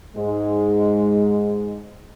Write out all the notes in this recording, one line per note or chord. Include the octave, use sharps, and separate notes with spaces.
G#2 G#3